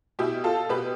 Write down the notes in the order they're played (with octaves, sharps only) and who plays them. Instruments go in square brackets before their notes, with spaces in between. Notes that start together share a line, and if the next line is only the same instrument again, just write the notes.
[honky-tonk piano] B2 E4 G4
F4 A4
B2 G4 B4